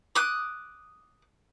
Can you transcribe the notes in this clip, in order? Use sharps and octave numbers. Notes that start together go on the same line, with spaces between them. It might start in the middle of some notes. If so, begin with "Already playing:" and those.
D6 D#6 F#6